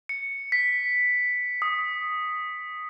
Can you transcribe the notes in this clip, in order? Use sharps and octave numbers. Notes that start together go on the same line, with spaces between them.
C#7
B6
D#6